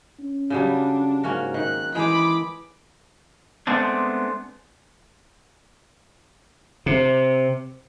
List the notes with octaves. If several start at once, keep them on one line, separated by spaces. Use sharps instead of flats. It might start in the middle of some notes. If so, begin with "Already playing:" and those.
C#4
C#3 F#3 G3 D4
G#2 A#3 C#4 F#4
D#3 F#6
E3 G#3 G#4 G5 B5 D6
G#3 A3 B3 C4 D4
C3